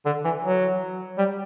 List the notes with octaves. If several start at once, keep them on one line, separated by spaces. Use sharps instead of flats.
D3
E3
F#3
G3